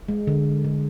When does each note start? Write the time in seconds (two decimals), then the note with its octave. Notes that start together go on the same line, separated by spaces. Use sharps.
0.08 G#3
0.27 D3
0.64 D3